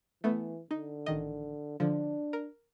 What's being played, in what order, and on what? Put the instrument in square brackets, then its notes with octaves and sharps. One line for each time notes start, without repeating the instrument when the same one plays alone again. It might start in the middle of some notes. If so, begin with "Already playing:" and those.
[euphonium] E3 [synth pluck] A3 B3
[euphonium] D3 [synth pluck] D#4
[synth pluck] A1 D#3 D#5
[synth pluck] D3 F3 [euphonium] D4
[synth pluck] A#4